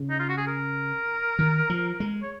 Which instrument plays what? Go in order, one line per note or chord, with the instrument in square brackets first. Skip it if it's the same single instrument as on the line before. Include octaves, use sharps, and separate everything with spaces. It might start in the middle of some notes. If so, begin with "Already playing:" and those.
Already playing: [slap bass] C#3
[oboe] D#4
F4
F#4
G#4
A#4
[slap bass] D#3
F3
G#3
[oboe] C#5